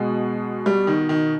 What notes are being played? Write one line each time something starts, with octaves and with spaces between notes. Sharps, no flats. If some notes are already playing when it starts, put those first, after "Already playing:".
Already playing: B2 G#3
G3
D#3
D#3